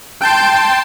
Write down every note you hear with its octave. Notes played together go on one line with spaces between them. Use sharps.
G5 A5 C6 G6